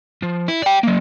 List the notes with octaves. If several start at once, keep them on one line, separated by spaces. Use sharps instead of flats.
F3
E4
D5 G5
F#3 A#3